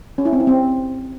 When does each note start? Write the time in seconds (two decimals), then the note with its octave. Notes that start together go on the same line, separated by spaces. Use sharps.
0.18 C#4
0.25 E4
0.33 C4
0.40 E4
0.47 C4